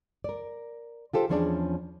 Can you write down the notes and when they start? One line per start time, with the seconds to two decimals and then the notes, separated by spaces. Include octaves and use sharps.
0.24 A#4 D5
1.13 F4 G4 A4 C5
1.29 E2 F3 C#4 D4 G#4 D5